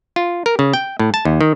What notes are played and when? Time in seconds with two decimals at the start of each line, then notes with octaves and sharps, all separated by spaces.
0.16 F4
0.46 A#4
0.59 C#3
0.74 G5
0.99 A2
1.14 A5
1.25 D#2
1.41 D#3